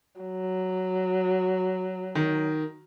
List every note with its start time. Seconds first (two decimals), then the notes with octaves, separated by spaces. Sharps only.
0.20 F#3
2.15 D#3